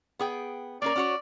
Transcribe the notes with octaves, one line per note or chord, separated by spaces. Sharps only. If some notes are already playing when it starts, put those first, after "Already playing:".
B3 G#4 G5
A#3 C#4 A#4 D5
C#4 F#4 C#5